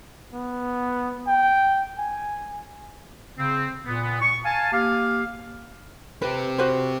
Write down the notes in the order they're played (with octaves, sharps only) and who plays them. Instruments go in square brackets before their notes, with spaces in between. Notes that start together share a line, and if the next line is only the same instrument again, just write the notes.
[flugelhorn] B3
G5
G#5
[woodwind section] C#3 C4
A#2 B3
C#6
F5 G#5 A5
A#3 G4 F5
[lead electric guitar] C4 G4 [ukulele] B4
[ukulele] F#4 B4 C5